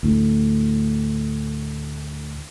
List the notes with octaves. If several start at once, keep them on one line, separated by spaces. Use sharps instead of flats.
D2 A2